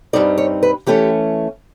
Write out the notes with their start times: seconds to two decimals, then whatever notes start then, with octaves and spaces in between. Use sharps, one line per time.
0.13 G2 D#3 G3 C4 D#4 D5
0.38 C#5
0.63 B4
0.87 E3 A3 C#4 G4